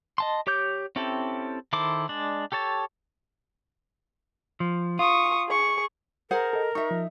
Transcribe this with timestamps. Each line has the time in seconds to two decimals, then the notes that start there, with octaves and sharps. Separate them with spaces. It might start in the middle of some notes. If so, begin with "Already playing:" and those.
0.18 D#5 A5 C6
0.47 G4 C#5 D6 G6
0.96 C4 C#4 E4 G4 A4
1.73 D#3 E4 A4 C5 D6
2.09 G#3 D4 D5
2.52 G4 A4 C#5 A5
4.60 F3
4.99 F4 C#6 D#6
5.49 G#4 C#6
6.31 G#4 A#4 C5 F#5
6.53 A4 D#5
6.75 D#4 E5 C#6
6.91 F3